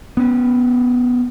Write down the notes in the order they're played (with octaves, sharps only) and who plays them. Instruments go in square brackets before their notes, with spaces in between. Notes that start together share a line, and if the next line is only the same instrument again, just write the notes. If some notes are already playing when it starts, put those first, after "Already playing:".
[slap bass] B3 C#4